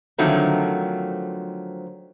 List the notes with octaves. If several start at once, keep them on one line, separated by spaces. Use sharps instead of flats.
D3 D#3 F3 F#3 A3 C4